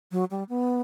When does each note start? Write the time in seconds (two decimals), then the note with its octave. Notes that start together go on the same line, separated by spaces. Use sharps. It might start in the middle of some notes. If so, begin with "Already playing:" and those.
0.12 F#3
0.31 G3
0.49 B3